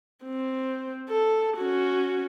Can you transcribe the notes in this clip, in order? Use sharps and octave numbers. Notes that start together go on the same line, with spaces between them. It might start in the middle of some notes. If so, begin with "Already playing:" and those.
C4
A4
C#4 F#4